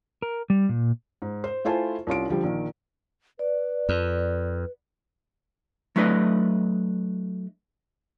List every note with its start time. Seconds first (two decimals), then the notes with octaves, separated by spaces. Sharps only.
0.22 A#4
0.50 G3
0.69 A#2
1.22 G#2
1.44 C5
1.65 A3 E4 F4 C5 G#5 A5
2.07 C2 C#4 F4 D7
2.29 D3 F3 G3
2.44 A#1 D#3
3.39 B4 D5
3.89 F2
5.96 F#3 A3 D4 E4 B4 D#5